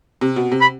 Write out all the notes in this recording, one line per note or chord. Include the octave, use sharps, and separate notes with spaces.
C3
B2
C3
B5